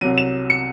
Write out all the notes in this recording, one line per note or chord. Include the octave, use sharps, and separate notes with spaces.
C2 C3 F#3 D#7
E7
C#7